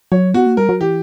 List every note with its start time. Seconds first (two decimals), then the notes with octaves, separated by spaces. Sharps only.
0.12 F#3 C#5
0.34 B3 F#4
0.46 A#3
0.57 G3 A#4
0.69 F#3
0.81 E3 G4